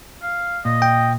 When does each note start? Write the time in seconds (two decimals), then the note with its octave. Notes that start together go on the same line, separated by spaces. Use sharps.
0.23 F5
0.65 A#2 D#5
0.82 G5